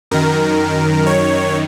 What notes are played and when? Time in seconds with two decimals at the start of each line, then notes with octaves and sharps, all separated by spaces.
0.11 F#2 D#3 A#4
1.07 C#5